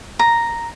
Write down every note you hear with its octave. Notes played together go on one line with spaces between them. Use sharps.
A#5